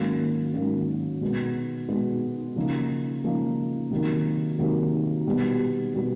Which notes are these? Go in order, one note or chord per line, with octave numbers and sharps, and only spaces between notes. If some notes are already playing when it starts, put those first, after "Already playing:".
Already playing: G#2 D#3 F#3 A#3 C#4
G#2 D#3 F#3 A#3 C#4
B2 G#3 B3
B2 G#3 B3
C#3 F3 A#3 D#4
C#3 F3 A#3 D#4
C3 D#3 F#3 A#3 D#4
C3 D#3 F#3 A#3 D#4
B2 G3 B3
B2 G3 B3